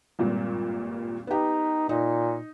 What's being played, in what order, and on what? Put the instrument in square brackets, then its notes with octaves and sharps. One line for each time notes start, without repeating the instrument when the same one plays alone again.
[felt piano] G#1 G2 A#2
[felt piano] B3 G4 [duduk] D#4
[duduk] A#2 [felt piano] D#4